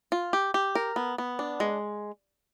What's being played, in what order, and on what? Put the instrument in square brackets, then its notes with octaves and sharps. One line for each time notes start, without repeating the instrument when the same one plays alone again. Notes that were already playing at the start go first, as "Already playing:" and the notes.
[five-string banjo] F4
G4
G4
A#4
B3
B3
D4
G#3